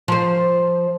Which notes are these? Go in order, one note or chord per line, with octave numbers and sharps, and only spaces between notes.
F3 C5